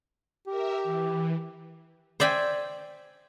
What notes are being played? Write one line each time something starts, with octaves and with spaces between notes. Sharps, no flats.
G4 A#4 E5
E3
C5 D5 E5 G5 G#5